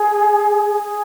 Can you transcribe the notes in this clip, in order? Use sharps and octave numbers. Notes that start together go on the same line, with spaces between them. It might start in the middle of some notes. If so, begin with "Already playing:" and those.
Already playing: G#4
G#4